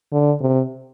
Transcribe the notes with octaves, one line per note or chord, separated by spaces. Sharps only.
D3
C3